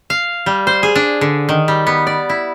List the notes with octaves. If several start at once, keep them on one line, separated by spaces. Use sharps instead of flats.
F5
G3
C5
G#4
D4
D3
D#3
G3
B3
D5
E4